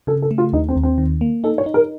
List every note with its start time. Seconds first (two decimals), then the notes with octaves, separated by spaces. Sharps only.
0.07 C#3 A4
0.22 A4
0.31 A3
0.38 F4
0.53 D#2 D#4
0.69 C4
0.76 D#2
0.83 C4
0.98 D#3
1.21 A#3
1.44 D#4 A4
1.58 C#5
1.66 D#4
1.74 A#4